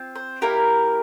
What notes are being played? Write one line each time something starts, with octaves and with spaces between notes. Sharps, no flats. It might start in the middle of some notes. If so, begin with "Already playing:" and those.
Already playing: C4 F4
C5
A#3 E4 G4 A#4